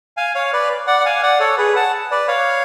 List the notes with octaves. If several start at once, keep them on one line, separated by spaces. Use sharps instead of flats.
F5 G#5
C#5 F5
B4 D5
D5 F#5
F#5
F5 G#5
D5 F#5
A4 C#5
G#4 B4
F#5 A5
B4 D5
C#5 F5